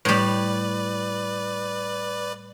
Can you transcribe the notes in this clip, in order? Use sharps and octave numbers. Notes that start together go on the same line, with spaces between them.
A2 G3 B4 D5